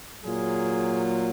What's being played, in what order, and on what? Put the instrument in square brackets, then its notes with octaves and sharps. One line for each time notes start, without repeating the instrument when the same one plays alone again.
[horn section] A#2 F#3 G#4